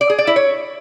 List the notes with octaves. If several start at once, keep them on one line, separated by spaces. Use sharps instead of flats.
D5
G#4
D5
E4
C#5